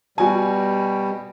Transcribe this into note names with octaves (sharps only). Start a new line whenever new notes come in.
B2 G3 F#4 G#5